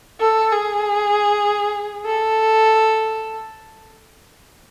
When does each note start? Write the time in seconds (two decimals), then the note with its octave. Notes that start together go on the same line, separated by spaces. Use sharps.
0.20 A4
0.52 G#4
2.06 A4